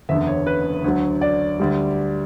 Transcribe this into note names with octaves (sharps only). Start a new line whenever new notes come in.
F#1 E2 D3 E5
C#5
B4
D2 D3 F#3
D5
D2 D3 G3